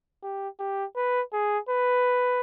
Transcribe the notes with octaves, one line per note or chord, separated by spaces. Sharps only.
G4
G4
B4
G#4
B4